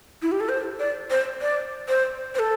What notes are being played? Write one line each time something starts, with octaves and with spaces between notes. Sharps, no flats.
E4
G4
A4
C5
D5
C5
D5
C5
C5
A4